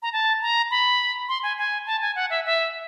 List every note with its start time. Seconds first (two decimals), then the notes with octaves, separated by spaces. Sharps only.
0.02 A#5
0.13 A5
0.42 A#5
0.71 B5
1.28 C6
1.43 G#5
1.58 G#5
1.86 A5
2.01 G#5
2.16 F#5
2.30 E5
2.45 E5